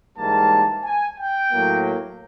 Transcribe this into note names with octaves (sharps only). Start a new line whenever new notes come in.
G#2 E3 G3 A#3 A5
G#5
G5
A2 F#3 A#3